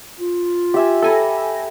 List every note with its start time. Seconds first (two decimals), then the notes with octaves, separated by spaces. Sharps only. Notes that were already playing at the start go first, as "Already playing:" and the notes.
0.19 F4
0.74 G4 E5 G#5
1.02 A4 G5 G#5 B5 A#6